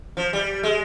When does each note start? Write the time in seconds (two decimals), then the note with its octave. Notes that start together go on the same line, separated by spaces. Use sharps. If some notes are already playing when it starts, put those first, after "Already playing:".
0.17 F3
0.33 G3
0.63 G#3